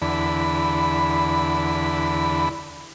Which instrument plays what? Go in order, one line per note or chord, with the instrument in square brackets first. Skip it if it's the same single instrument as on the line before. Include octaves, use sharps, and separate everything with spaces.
[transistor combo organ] E2 D3 B5